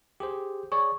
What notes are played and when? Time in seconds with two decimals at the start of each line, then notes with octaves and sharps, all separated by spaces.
0.20 G4 G#4 C5
0.72 G#4 C#5 D5 C#6